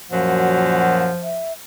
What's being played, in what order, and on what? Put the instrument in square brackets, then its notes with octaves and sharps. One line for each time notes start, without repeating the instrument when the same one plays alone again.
[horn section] F#2 A#2 F#3 [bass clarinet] F3 [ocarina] F#5
[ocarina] E5